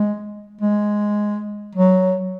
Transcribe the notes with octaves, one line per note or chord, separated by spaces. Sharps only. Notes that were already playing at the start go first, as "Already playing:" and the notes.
Already playing: G#3
G#3
F#3